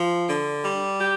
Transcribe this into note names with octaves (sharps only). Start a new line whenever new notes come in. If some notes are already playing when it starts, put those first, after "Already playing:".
Already playing: F3
D3
G3
G4